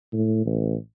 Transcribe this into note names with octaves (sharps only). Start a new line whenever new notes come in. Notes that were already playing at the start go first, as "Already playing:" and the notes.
A2
A1